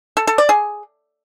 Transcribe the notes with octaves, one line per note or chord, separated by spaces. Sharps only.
A4
A4
D5
G#4